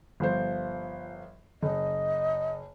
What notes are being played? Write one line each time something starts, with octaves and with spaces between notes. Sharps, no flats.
G1 F3 C5
F#1 D#5